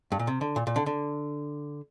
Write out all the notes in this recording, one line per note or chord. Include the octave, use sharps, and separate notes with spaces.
G2
A#2
C3
D3
A#2
A#2
D3
D3